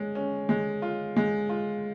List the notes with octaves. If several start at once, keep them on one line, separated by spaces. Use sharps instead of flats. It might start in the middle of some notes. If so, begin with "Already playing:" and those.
Already playing: G#3 C#4
C#4
G#3
F4
G#3
F4